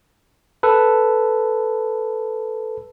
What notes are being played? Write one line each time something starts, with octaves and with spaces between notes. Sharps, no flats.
A4 B4